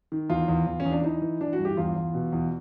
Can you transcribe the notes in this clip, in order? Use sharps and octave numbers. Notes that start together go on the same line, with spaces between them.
D#3
E2 F4
E2
E2
C#4
E2
D4
E3 D#4
E3
E3 D4
F#4
G2
G4
E2 F4
E2
B2
E2